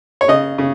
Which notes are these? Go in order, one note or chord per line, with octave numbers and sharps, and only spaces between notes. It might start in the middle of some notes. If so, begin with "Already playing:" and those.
C#5
C#3 D#5
C#3